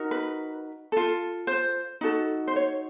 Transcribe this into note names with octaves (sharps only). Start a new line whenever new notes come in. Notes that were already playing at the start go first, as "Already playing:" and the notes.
Already playing: D#4 F#4 A#4
B4
F4 A4
C5
D#4 F#4 A4
C5
C#5